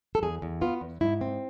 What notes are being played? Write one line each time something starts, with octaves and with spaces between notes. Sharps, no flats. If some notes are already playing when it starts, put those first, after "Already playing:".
A4
E2 G#4
E2
B3 F4
E2
G#2 E4
C4